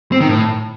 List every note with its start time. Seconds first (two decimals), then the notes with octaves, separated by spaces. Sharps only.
0.12 C4
0.20 D#3
0.29 A2